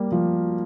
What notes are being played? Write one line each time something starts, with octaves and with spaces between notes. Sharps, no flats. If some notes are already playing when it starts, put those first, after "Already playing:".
Already playing: G3 A#3
F3